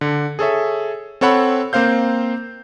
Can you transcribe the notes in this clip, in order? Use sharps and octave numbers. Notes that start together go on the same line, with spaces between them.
D3
G#4 A4 C#5 E5
C4 A4 C#5 F#5 B5
A#3 C4 C5 F5 G6